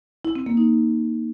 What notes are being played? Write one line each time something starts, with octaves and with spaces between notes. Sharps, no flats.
E4
C4
A#3
D#4